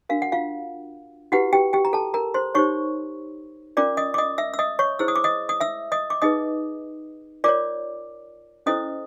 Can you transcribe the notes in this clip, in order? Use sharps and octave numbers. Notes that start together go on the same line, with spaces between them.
D4 F#4 A#4 F5
F#5
F4 F5
E4 F#4 G4 B4 F#5
G4 G5
G4 G5
A#5
A4 A5
A#4 A#5
C5 C6
D#4 G4 C5 C#5 C#6
C#4 F4 A#4 D5 D6
D#5 D#6
D6
D#5 D#6
E5 E6
E6
D#5 D#6
C#5 C#6
E4 G#4 C5 E6
D#6
D6
D#5 D#6
D#6
E5 E6
D#5 D#6
D6
D#4 G#4 B4 D#5 D#6
F4 A#4 C#5 D5 D6
C#4 E4 A4 C5 D#5 D#6